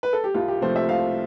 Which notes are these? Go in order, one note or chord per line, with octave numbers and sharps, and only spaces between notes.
B4
A4
G4
C2 F4
G4
C3 F3 A3 C5
E5
C2 F5